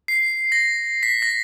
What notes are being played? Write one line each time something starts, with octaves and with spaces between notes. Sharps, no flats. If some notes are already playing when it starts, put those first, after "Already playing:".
C7
A#6
B6
A#6